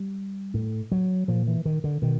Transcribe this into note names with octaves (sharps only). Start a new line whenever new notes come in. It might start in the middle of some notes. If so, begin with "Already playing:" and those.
Already playing: G3
A2
F#3
A#2 F3
E3
D#3
D3
B2 D#3